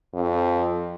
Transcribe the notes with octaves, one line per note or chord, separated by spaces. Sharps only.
F2